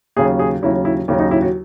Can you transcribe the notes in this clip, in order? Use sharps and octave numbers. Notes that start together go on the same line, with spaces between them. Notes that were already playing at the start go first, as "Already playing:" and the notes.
D#2 C#3 F#3 G#4
G#4
D#2 C#3 F#3 E4
E4
D#2 C#3 F#3 C#4
D#4
E4
F#4